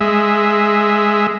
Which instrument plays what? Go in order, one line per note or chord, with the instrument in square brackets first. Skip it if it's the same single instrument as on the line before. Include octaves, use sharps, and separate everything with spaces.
[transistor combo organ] G#3 E5